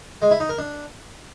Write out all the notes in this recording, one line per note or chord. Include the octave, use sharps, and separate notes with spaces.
G#3
E4
D#4
A#4
D4